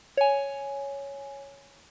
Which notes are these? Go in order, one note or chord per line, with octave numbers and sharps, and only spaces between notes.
C#5 G#5